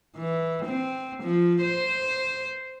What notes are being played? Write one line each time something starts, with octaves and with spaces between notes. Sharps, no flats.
E3
C4
F3
C5